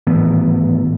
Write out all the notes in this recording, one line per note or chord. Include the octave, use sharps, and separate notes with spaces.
G#1 A2 E3 B3